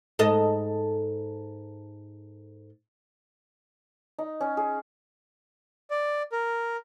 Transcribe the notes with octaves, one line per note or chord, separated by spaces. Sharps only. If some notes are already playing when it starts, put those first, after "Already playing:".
G#2 A4 D#5
D#4
C#4
G#4
D5
A#4